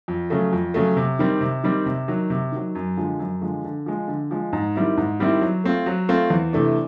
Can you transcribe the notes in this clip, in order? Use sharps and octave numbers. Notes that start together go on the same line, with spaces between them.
F2
C#3 F#3 A3
F2
C#3 F#3 A3
C3
D#3 G3 C4
C3
D#3 G3 C4
C3
D#3 F#3
C3
D#3 F#3
F#2
D3 F3 G#3
F#2
D3 F3 G#3
D3
F3 G#3
D3
F3 G#3
G#2
D#3 G3 C4 E4
G#2
D#3 G3 C4 E4
F#3
A3 C4 F4
F#3
A3 C4 F4
E2
C3 E3 A3 D4